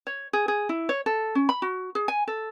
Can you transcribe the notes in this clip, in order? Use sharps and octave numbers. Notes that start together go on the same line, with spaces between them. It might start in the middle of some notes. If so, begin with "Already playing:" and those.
C#5
G#4
G#4
E4
C#5
A4
C#4
B5
F#4
G#4
G#5
A4